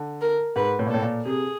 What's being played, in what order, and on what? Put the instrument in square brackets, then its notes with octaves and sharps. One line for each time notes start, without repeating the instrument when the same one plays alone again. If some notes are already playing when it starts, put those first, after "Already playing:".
Already playing: [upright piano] D3
[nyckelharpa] A#4
[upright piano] G#2 [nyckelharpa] B4
[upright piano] A2
A#2
[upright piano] A2 [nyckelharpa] A4
[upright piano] A#2
[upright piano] C3 [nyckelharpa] G#4